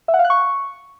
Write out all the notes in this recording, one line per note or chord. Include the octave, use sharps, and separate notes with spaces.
E5
F#5
F5
F#6
C#6